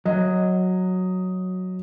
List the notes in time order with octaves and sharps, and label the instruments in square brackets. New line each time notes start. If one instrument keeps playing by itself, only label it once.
[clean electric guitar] F#3 [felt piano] D#5